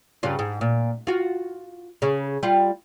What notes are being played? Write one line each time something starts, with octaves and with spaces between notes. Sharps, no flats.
G2 C#3 F4
G#2
A#2
F4 F#4
C#3
G3 F4